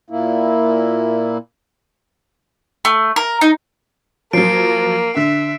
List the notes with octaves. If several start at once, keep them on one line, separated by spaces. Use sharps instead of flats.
A#2 A#3 E4
A3
A#4
D#4
F3 F#3 A#3 C7 D7
D3 E5